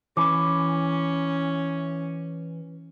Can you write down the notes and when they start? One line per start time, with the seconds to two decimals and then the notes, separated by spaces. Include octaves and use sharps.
0.17 E3 C#4 D6